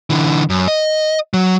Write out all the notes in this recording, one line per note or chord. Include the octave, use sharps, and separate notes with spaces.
D3 E3
F#2
D#5
F#3